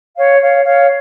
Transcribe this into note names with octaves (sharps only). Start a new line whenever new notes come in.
C#5 F5
C#5 F5
C#5 F5